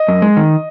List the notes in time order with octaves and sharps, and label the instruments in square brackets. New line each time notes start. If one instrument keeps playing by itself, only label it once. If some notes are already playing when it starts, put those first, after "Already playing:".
Already playing: [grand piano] D#5
[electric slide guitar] F#2
G#3
D#3